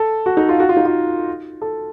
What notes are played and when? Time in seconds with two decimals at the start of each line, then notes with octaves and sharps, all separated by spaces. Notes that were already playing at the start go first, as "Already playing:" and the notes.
Already playing: A4
0.26 F#4
0.37 D#4
0.49 F4
0.60 F#4
0.69 F4
0.77 D#4
0.85 F4
1.62 A4